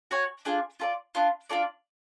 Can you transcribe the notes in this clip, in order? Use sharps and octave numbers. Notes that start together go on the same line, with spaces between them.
F#4 C#5 G#5
D4 F4 G#4
F4 A4 D5
B3 D4 F4
D4 F4 A4 D5